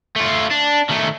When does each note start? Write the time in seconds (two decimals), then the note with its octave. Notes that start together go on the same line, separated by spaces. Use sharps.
0.16 A3 F4
0.51 D4
0.90 D#3 A3